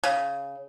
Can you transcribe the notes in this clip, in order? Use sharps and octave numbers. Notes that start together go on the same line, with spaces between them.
C#3